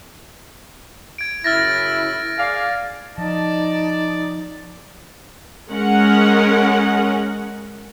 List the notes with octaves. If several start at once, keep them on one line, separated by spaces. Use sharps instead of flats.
G#6 D7
F#2 C#3 E4 F6 A6 A#6
G#4 D5 F5
F3 D#4 D5 D#5 A5
G#3 C#4 A#4 F#5